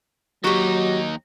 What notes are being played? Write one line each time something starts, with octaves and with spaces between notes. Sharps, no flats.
D#2 F#3 D#4 F#4 G4